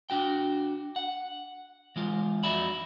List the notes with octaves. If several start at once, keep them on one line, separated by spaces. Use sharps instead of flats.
D4 F#4 G5
F#5
E3 G#3 F4
F2 D#4 F#4 D5 E5 B5